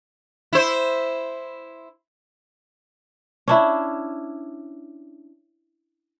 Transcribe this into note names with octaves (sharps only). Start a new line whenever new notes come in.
E4 C5
C#4 D4 E4